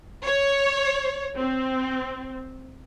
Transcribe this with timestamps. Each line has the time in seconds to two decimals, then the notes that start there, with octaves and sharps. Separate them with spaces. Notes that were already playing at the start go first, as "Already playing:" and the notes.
0.25 C#5
1.35 C4